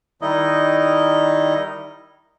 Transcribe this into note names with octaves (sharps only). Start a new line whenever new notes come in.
D#3 G3 D#4 E4 D#5